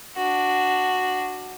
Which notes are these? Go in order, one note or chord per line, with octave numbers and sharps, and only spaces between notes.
D4 F#4